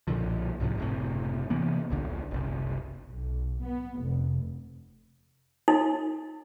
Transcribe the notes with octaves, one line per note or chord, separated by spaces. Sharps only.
B1 A#2 D3 F3
C2 G#2 C3 F3
F#1 A2 C3
C3 E3 A#3 B3
D1 A#1 D3
F#1 C2
B1
B3
F1
D#4